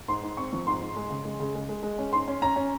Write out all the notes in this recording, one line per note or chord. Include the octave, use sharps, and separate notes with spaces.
G#2 C6
G#2
C4 C#6
F3
G#2 C6
G#2
G#3
C#3
G#3
C#3
G#3
G#3
G#3
C#4
G#2 C6
C#4
C#4 A#5
C#4